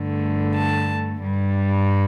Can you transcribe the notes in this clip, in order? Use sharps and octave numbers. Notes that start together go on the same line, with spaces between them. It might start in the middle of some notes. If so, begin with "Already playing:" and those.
Already playing: G2 D3 A3
A5
G2 G3